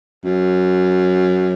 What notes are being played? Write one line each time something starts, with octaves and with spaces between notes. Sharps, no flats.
F#2